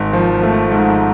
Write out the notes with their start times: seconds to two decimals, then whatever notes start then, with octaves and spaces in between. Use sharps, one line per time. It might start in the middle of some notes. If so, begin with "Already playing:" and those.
Already playing: G#1
0.13 F3
0.43 A3
0.72 G#2